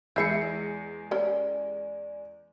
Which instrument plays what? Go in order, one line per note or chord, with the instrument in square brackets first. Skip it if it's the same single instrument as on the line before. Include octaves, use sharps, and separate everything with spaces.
[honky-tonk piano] E2 G#3 C#7 [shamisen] E4 E5 [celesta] G6 C7
[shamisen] C#4 G4 A#4 [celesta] D5